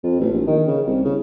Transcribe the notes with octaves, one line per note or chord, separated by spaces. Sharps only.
F2
A1
A#1
D#3
C#3
C2
C#3